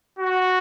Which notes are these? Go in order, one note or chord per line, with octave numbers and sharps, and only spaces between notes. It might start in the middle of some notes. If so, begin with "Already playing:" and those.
F#4